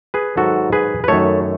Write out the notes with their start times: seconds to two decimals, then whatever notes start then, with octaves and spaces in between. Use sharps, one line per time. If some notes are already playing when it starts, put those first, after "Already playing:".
0.14 G#4 B4
0.37 G#2 D#3 F#3 F#4 A4
0.73 G#4 B4
1.04 B4
1.08 F#2 D#3 A3 A4 C#5